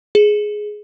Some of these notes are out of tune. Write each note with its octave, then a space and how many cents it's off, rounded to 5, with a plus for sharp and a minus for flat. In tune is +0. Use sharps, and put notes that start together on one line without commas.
G#4 +10